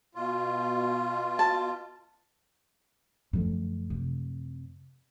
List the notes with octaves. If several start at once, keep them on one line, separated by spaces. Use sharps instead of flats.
B2 F4
A5
F#2 D3 F3 A3
C3